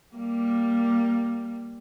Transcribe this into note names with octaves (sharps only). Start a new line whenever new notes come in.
G3 A#3